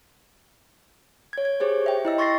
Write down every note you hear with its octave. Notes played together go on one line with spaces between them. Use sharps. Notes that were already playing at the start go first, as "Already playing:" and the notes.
C#5 G#6
G#6
G4 G#4 C5 C#5
E5 G5
E4 D#5 E6
C6 C#6 A6 A#6 C7